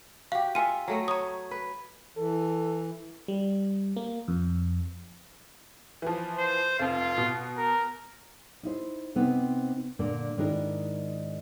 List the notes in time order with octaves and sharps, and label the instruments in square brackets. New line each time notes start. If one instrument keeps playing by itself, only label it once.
[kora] F#4 G4 [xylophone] F5
[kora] F4 E5 [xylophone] G#5 D#7
[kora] F#3 A3 D#5
[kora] C#5 [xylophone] A#5 D#6
[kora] B4
[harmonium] E3 [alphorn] A4
[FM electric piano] G3
A#3
F2
[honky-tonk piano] E3 F3
[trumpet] C5
[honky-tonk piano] F1 F2 [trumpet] F4
[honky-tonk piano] B2
[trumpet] A#4
[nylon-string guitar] D#4 E4 C5
C3 B3 C4 D#4
A#2 D3 A#3
G#2 D#3 D4 E4 A#4